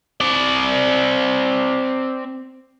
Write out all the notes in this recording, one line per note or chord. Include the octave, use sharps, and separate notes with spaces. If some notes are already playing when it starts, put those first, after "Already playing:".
C4 D5